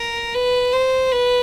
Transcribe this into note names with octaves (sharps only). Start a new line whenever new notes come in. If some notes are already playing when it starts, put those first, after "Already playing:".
Already playing: A#4
B4
C5
B4